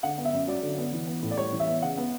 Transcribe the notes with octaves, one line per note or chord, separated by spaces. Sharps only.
D3 F#5
B3
E5
F#2
F#3 D5
D3
B3
E3
B3
A2
D5
G3 C#5
E3
E5
B3
C#3 F#5
B3